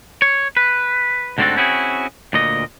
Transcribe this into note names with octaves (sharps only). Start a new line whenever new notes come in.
C#5
B4
D2 G#2 D3 C4 F#4 A4
C4 C#4 E4 F#4 G#4
D2 A#2 D#5